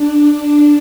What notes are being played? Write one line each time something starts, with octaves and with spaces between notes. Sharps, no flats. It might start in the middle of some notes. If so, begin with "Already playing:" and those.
Already playing: D4